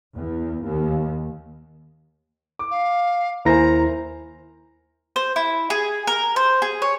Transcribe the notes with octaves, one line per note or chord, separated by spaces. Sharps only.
E2
D#2
D6
F5
D#2 E4 A#4 C5 G#5 A#5 A#6
C5
E4
G#4
A#4
C5
G#4
C#5